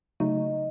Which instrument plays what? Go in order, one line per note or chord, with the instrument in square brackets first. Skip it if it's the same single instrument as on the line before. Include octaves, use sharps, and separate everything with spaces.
[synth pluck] C#3 F#3 A3 D#4 F#4 [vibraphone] D#5